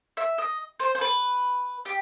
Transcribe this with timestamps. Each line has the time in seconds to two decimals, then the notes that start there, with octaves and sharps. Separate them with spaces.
0.17 E5
0.38 D#5
0.80 C5
0.95 C5
1.01 B4
1.85 G4